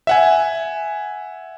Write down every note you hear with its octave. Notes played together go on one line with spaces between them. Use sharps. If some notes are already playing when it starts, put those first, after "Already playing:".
E5 F#5 G#5